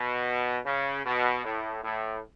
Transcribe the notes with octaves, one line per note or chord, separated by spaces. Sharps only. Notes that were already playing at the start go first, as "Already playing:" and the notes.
Already playing: B2
C#3
B2
A2
A2